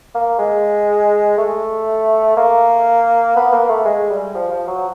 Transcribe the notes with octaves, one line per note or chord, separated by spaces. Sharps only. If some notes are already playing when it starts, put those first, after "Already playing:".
A#3
G#3
A3
A#3
B3
A#3
A3
G#3
G3
F3
F3
F#3